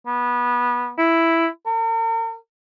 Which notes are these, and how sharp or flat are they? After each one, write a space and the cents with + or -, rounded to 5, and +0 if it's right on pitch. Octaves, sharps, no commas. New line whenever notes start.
B3 -20
E4 +5
A#4 -40